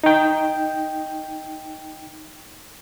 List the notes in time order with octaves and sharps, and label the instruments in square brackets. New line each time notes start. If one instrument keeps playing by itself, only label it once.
[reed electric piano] D#4 G5